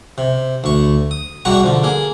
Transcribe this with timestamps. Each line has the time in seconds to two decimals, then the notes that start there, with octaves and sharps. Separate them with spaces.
0.18 C3
0.64 D2 C#6
1.11 D#6
1.45 E2 B2 G3 F#4 A#5 C#6
1.63 D3 F3
1.84 A#3 G#4